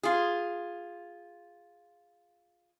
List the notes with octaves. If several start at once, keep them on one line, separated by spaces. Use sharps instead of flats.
F4 G#4